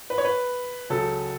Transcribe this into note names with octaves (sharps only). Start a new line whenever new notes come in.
B4
C#5
B4
C#2 C#3 F#3 C#4 A4